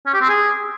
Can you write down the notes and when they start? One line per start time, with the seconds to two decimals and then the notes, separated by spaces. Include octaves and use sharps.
0.06 C#4
0.14 G4
0.21 C4
0.29 G#4